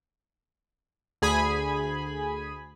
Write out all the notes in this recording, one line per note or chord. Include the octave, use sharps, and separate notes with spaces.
D2 G#4 G#5 B5